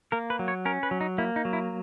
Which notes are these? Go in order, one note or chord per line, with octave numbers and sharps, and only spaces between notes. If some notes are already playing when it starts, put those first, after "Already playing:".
A#3 A#4
B4
F#3
C#5
C#4 A#4
B4
F#3
D#4
A#3 E4
D#4
F#3
E4